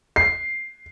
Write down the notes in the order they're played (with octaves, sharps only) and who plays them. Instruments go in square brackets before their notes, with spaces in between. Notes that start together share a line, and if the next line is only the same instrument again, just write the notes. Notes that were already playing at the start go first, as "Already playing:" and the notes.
[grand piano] C7